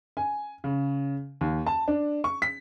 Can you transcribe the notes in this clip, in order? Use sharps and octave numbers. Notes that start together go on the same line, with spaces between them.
G#5
C#3
D#2
A5
D4
C#6
B6